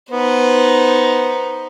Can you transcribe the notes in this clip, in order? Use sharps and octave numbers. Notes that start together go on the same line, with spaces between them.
B3 D#4 C5